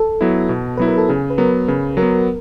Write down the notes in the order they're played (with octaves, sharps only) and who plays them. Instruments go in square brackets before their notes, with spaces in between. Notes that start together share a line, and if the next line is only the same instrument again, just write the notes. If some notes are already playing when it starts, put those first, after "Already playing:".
Already playing: [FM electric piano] A4
[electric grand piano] F#3 B3 E4
B2
[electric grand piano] F#3 B3 E4 [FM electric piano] B4
[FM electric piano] A#4
A4
[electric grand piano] C#3 [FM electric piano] G#4
[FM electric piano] B4
[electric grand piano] F#3 B3 [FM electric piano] A#4
[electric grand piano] C#3 [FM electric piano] B4
[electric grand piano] F#3 [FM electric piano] A#4
[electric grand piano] B3